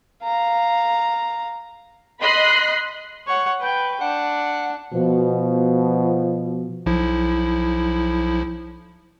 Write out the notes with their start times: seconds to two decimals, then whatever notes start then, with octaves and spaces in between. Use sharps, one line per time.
0.24 F5 A#5
2.21 D#5 B5 C6 F#6 C7
3.27 C#5 F#5
3.61 B4 G5
4.01 D4 F#5
4.93 B2 F3
6.86 B1 F3 E4